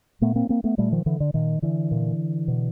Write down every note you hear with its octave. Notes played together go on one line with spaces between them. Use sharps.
A#2 A3 B3
A#3 C4
A#3 C4
A3 B3
A#2 G3 A3
D#3 F3
D3 E3
D3
A#2 D#3
D3 E3
A#2
B2